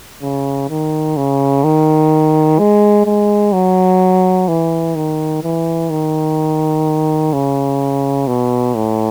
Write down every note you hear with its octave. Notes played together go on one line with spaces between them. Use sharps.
C#3
D#3
C#3
D#3
G#3
G#3
F#3
E3
D#3
E3
D#3
C#3
B2
A2